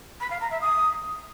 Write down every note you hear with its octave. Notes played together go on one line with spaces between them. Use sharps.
B5
F5
A#5
E5
D#6